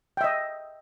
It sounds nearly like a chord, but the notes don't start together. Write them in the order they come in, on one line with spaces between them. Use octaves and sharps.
G5 E5 D#5